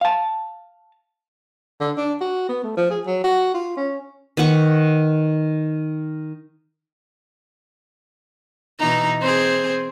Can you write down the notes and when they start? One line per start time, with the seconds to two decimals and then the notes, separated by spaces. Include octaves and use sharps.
0.01 F5 A5
1.80 D3
1.97 D4
2.21 F#4
2.49 B3
2.63 A3
2.77 F3
2.91 G#4
3.06 F#3
3.24 F#4
3.54 F4
3.77 C#4
4.37 D#3 B4 F#5 C#6
8.79 B2 E3 D#4 A#5
9.22 C4 G#4 C5